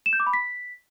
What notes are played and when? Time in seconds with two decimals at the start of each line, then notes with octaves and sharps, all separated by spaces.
0.06 E7
0.13 G6
0.20 D6
0.27 B5
0.33 B6